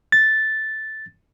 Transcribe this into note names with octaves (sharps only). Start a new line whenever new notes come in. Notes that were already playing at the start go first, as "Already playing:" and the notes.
A6